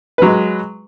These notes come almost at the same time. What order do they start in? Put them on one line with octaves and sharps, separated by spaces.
B4 F#3 G#3